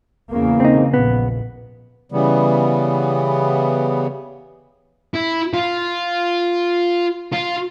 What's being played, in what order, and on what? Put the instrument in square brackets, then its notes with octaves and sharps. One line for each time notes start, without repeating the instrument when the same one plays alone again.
[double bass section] E2 C#3 A#3
[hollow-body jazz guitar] C4 D#4
[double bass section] A#1 [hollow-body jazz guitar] B3
[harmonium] C#3 E3 G3 B3
[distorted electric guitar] E4
F4
F4